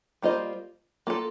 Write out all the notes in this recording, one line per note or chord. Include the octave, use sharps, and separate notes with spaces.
G3 A#3 F4 C5 D#5
A#3 F4 A4